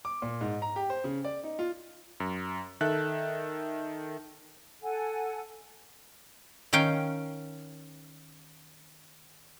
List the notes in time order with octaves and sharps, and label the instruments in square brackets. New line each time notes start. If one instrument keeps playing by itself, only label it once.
[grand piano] D6
A#2
G#2
A#5
G4
C5
C#3
D5
D#4
F4
[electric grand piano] F#2
D#3 A4 E5 F#6
[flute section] A4 F#5 G#5
[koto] D#3 C#4 F5 G5